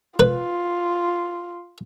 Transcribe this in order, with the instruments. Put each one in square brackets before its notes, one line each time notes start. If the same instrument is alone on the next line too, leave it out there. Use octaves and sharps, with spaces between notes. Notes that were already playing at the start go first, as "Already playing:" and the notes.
[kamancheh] F4 [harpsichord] B4